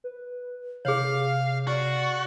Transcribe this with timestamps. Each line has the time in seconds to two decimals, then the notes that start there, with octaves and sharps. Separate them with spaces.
0.04 B4
0.85 C3 G#4 C#5 F5
1.67 F#4 D5